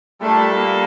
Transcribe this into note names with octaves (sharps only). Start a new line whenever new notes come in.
A#2 G3 A3 D4 A4
A#3